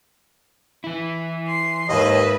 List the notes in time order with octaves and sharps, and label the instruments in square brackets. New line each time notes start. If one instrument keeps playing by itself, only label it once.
[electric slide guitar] E3 E4
[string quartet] C6
[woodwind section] D#2 [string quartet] G#2 B4 E5 [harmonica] D#5